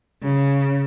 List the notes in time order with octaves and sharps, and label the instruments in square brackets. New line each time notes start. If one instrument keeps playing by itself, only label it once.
[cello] C#3